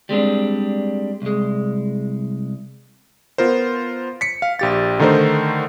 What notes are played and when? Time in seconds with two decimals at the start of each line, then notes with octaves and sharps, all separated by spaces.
0.09 G3 G#3 C4 D4
1.22 C2 G#3
3.38 B3 F4 A#4 C5
4.21 B6 C#7
4.42 F5
4.59 A#1 G4 A6
4.99 D3 D#3 A3 D#4 A#4 C5